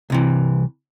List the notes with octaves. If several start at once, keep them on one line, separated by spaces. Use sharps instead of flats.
C2 C3 E3